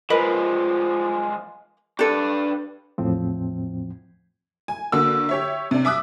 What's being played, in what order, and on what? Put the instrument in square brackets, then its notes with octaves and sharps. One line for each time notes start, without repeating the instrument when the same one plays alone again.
[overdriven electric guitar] F3 G#3 [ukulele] A#4 B4 D#5
[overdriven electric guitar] D4 B4 [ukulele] G4 A4
[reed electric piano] E2 A2 F3 C4
[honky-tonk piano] G#5
D3 A#3 F#4 E6
G4 C#5 E5
C3 D4
E5 D6 D#6 F#6